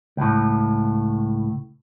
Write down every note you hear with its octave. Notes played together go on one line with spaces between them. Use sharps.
C#2 A2